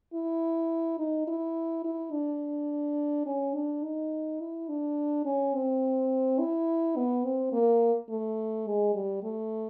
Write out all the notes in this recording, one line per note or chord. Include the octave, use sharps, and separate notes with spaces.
E4
D#4
E4
E4
D4
C#4
D4
D#4
E4
D4
C#4
C4
E4
B3
C4
A#3
A3
G#3
G3
A3